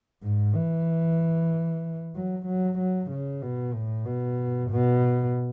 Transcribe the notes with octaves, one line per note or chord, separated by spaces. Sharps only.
G#2
E3
F#3
F#3
F#3
C#3
B2
A2
B2
B2